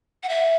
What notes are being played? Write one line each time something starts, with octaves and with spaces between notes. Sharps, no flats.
F#5
E5